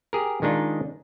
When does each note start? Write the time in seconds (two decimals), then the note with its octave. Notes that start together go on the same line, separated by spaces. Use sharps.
0.13 G4 G#4 A#4
0.42 D#3 G#3 D4 D#4 F4